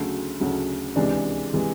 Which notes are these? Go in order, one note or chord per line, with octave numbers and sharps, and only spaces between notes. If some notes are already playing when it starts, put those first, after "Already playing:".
Already playing: D2 C#3 F#3 A3
D2 C#3 F#3 A3
C#2 C3 E3 G#3 D4
C3 E3 G#3